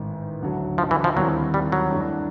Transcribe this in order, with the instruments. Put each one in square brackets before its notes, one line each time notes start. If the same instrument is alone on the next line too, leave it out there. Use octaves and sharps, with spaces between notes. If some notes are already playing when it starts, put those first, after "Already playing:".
Already playing: [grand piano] A1 G#2 D#3
D2 D3 F#3
[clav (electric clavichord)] F3
E3
F3
[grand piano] D#2 D#3 G3 C4 E4 [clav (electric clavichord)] F#3
[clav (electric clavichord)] G3
F#3
[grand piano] G2 E3 A3 D4